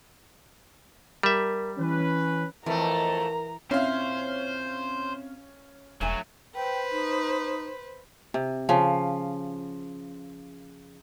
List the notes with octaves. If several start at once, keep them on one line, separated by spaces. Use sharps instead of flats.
G3 A#4 E5
E3 C#4 B4
F2 E3 A3 A#4 D#5 A#5
A#2 C4 C#4 E4 C5 F5
E1 G2 F#3 A3 G#5
B4 C5 G5
D#4
C3
C#3 F3